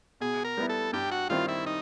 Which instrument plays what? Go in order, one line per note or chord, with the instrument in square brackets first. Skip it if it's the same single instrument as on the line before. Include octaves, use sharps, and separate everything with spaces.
[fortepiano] B2 [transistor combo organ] G#4
[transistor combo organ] A#4
[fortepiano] G3 B3 E4
[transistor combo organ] A4
[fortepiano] G2 [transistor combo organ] G4
[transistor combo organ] F#4
[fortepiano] D#3 G3 C4 E4 [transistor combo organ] F4
[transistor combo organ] E4
D#4